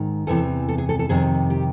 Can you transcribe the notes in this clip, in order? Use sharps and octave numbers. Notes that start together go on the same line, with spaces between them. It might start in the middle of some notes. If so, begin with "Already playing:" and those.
Already playing: G#2 D#3
E2 C3 E3 A4
A4
G#4
A4
A4
F2 C3 D#3 G#4
G4